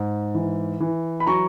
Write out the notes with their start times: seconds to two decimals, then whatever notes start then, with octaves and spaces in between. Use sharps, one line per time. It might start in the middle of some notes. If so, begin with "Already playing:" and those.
Already playing: G#2
0.35 E3
0.80 E3
1.20 B5
1.26 F#3 A#5 C#6